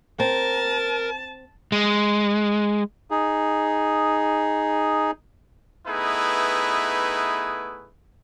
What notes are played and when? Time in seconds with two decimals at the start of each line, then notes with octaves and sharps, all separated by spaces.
0.20 C4 A#4 A5
1.72 G#3
3.11 D#4 G#4
5.87 A3 B3 D#4 E4 G#4 B4